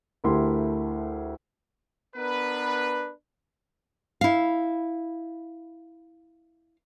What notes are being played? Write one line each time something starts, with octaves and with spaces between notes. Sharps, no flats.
D2 A3 E4 G4 A#4 C6
B3 D4 A#4 B4
E4 F5